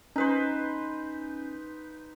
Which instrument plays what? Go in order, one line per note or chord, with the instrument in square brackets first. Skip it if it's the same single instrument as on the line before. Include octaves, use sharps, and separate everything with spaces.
[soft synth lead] C#4 [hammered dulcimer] D#4 B4 C5